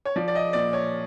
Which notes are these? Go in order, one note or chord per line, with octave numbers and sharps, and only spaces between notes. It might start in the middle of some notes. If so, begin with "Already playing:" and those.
C#5
F3 D5
D5
D#5
A#2 D5
C#5